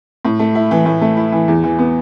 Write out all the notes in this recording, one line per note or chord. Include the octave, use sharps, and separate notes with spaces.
A2
A3
E4
E3
A2
A3
E4
E3
E2
E3
B3